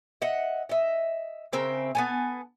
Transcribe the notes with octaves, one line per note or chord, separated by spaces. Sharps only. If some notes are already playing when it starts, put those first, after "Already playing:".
D#5 E5 F#5
D#5 E5
C#3 C4 A#4 E5
B3 A4 G#5